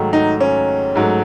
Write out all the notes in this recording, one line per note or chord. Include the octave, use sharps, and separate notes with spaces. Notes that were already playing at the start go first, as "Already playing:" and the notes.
Already playing: G#2 D#3 F#3 A3
D#4
C#4
G#2 F#3 A3